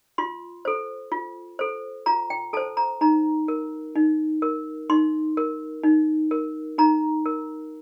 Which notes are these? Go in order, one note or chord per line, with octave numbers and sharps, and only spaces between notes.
F4 C6
A4 C5
F4
A4 C5
F4 A#5
G5
A4 C5 A5
A#5
D#4 A#5
A#4
D#4
A#4
D#4 C6
A#4
D#4
A#4
D#4 A#5
A#4